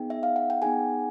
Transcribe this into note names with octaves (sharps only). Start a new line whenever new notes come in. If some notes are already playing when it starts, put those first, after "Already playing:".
Already playing: B3 D#4 G#4 G5
E5
F5
F#5
G5
B3 D#4 G#4 F#5 G#5